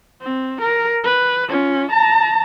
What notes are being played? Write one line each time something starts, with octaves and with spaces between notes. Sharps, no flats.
C4
A#4
B4
C#4 F4
A5 A#5